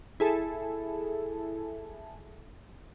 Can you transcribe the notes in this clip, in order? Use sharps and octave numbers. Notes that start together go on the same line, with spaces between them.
E4 G#4 A4